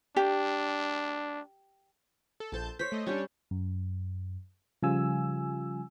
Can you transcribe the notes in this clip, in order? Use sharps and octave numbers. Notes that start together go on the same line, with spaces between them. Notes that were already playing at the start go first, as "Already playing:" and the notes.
D4 G4
A4
A#1 A4 C5 A5 G6
C5 C#5 B6
A3 D#5
G3 C#4 D4 G4 C#5
F#2
C#3 F3 G3 F4 G#5 E6